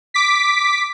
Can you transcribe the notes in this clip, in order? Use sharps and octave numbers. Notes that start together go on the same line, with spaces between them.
D6 B6